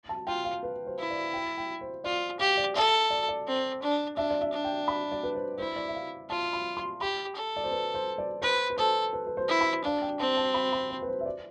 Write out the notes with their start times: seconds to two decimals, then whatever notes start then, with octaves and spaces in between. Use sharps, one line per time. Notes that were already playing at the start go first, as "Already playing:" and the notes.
0.09 A5
0.27 F4 G5
0.44 F5
0.63 B4
0.87 C5
0.99 E4
1.11 D5
1.33 G5
1.58 G5
1.81 C5
2.04 F4 D5
2.39 G4 F5
2.57 D5
2.75 A4 E5
3.10 D5
3.29 D5
3.47 C4
3.82 D4
4.16 D4 E5
4.31 D5
4.41 E5
4.52 D4
4.65 G5
4.88 B5
5.12 D5
5.23 B4
5.35 C5
5.59 E4 C5
5.76 D5
5.88 E5
5.94 F5
6.29 F4 A5
6.53 B5
6.77 C6
7.01 G4 B5
7.35 A4
7.56 D5
7.64 C5
7.71 B4
7.94 C5
8.18 D5
8.42 B4 C5
8.70 B4
8.78 A4 C5
9.13 B4
9.27 B4
9.37 C5
9.48 E4
9.61 B5
9.84 D4 F5
10.02 G5
10.20 C4 A5
10.37 A5
10.54 B5
10.73 B5
10.90 C5
11.02 B4
11.08 C5
11.21 E5
11.25 D5